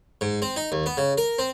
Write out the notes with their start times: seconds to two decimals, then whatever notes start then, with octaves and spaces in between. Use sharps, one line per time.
0.21 G#2
0.42 C4
0.56 D#4
0.72 D#2
0.86 B3
0.97 C#3
1.18 A#4
1.39 C4